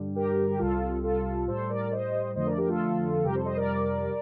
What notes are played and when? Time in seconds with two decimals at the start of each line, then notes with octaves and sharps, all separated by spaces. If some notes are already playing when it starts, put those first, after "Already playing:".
Already playing: G2 D3 G3
0.15 G4 A#4
0.49 G4
0.59 C2 C3 G3 F4 A4
1.03 F4 A4
1.47 A2 G3 A4 C5
1.69 A#4 D5
1.91 C5 D#5
2.36 F2 D3 F3 A3 C5 D#5
2.47 A#4 D5
2.57 G4 A#4
2.69 F4 A4
3.24 F2 C3 G3 G4 A#4
3.35 A4 C5
3.45 C5 D#5
3.56 A#4 D5